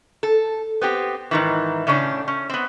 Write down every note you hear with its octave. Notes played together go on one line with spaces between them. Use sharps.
A4
B3 C4 G4
G#2 D#3 E3
A2 C#3 C#4 D4
C#4
B3 C4